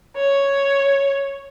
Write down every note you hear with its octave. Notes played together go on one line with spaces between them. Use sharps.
C#5